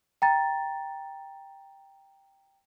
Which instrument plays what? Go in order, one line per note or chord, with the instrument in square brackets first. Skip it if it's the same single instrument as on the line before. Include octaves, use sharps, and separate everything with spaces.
[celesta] G5 A#5 A6